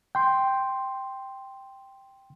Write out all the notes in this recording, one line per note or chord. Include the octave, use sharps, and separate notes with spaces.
G5 C6